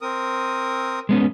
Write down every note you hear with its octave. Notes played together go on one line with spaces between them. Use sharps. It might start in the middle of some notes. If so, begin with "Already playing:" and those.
C4 A#4 D#6
G#3 B3 C#4